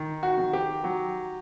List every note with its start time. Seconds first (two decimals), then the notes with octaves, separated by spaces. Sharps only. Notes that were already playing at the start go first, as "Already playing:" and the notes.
Already playing: D#3
0.23 F#4
0.38 D#3
0.53 G4
0.84 F#3